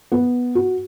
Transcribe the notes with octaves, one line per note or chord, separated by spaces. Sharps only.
B3
F#4